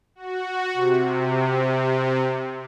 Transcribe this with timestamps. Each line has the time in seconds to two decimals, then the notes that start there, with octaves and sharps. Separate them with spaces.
0.15 F#4
0.74 C3